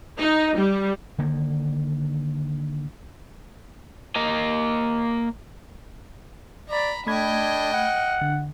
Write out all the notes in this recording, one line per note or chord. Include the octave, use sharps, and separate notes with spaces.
D#4
G3
D3 D#3 A#3
A#3 D#5
D5 A#5 B5
A3 D4 D#5 G5 B5 G#6
F#5
D3